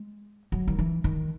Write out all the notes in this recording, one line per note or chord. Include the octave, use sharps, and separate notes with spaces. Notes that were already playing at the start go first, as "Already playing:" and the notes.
Already playing: G#3
F#3
D#3
E3
D#3